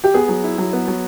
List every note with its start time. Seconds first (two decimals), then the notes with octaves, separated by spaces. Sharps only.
0.04 G4
0.14 B3 G#4
0.28 F#3
0.44 E4
0.58 F#3
0.73 B3
0.88 F#3